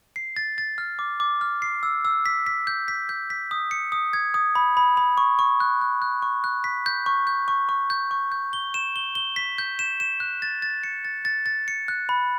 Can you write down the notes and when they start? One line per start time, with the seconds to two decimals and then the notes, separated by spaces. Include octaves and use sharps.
0.16 C7
0.36 A6
0.58 A6
0.78 F6
0.99 D6
1.20 D6
1.41 F6
1.62 C7
1.83 E6
2.05 E6
2.26 B6
2.46 B6
2.67 G6
2.88 B6
3.09 G6
3.30 B6
3.51 D#6
3.71 C#7
3.92 D#6
4.13 G#6
4.34 D#6
4.55 B5
4.77 B5
4.97 B5
5.18 C#6
5.39 C#6
5.60 F#6
5.81 F#6
6.02 F#6
6.22 C#6
6.44 F#6
6.64 B6
6.86 G6
7.06 C#6
7.27 G6
7.48 C#6
7.69 C#6
7.90 G6
8.11 C#6
8.32 G6
8.53 G7
8.74 E7
8.96 G7
9.15 G7
9.36 B6
9.58 G6
9.79 E7
10.00 E7
10.20 F#6
10.42 A6
10.62 A6
10.83 C#7
11.05 A6
11.25 A6
11.46 A6
11.68 C#7
11.88 F#6
12.09 B5